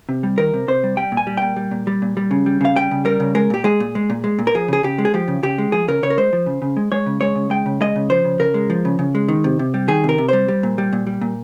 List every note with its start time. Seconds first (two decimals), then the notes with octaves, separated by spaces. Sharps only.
0.09 C3
0.23 G3
0.38 D#3 A#4
0.54 C3
0.68 C3 C5
0.83 G3
0.97 G3 G5
1.12 A#2
1.17 G#5
1.27 G3
1.37 A#2 G5
1.56 G3
1.71 A#2
1.87 G3
2.02 A#2
2.17 G3
2.31 C#3
2.46 G3
2.61 C#3 F5
2.76 G3 G5
2.91 C#3
3.05 G3 A#4
3.20 C#3
3.35 G#3 A#4
3.50 A#2 G4
3.64 G#3 G#4
3.80 A#2
3.95 G#3
4.10 A#2
4.24 G#3
4.39 A#2
4.47 A#4
4.55 F3 G#4
4.68 C#3 G#4
4.83 C#3 G4
4.98 G#3
5.05 G#4
5.14 F3 G4
5.28 C#3
5.43 C#3 G4
5.58 G#3
5.72 F3 G#4
5.88 C#3 A#4
6.03 C#3 C#5
6.10 A#4
6.17 G#3 C5
6.33 F3
6.46 C#3
6.62 C#3
6.77 G#3
6.92 G#3 C#5
7.06 C#3
7.21 G#3 C#5
7.35 C#3
7.50 G#3 G5
7.66 C#3
7.81 G#3 D#5
7.96 C#3
8.10 F3 C5
8.25 C#3
8.39 C#3 A#4
8.54 G#3
8.70 F3
8.85 C#3
8.99 C#3
9.15 G#3
9.28 D#3
9.44 C3
9.59 C3
9.74 G3
9.88 D#3 G#4
10.04 C3 A#4
10.18 C3
10.29 G3 C5
10.48 G3
10.63 A#2
10.78 G3
10.93 A#2
11.07 G3
11.21 A#2